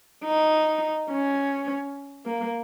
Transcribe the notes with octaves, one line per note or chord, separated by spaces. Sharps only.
D#4
C#4
A#3